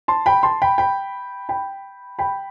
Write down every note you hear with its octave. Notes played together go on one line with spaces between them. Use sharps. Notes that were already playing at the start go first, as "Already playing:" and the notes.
A5 C6
G5 B5
A5 C6
G5 B5
G5 B5
G5 B5
G5 B5